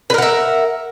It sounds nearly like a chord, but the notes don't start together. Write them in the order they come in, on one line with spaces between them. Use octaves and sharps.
B4 A#4 F#5 E5